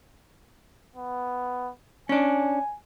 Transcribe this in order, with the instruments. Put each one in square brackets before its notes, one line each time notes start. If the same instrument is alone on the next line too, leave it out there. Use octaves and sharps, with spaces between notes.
[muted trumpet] B3
[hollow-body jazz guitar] C#4 D4 [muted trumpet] G#5